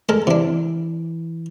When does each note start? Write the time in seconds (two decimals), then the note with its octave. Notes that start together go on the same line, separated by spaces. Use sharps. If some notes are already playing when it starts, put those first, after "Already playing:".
0.09 G#3 A4 A#4
0.27 C3 E3 D4